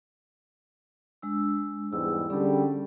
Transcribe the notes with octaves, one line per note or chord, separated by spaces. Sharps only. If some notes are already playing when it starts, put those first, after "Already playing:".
G#3 D4 E6
E2 G#2 G3 E6
D3 G3 C#4 G#4 D5